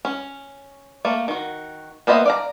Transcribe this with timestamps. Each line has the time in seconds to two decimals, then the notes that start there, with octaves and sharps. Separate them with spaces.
0.05 C#4
1.05 A3 A#3
1.28 D#3 F#4
2.07 A#3 B3 C5 D#5 E5
2.26 D5 F5 A#5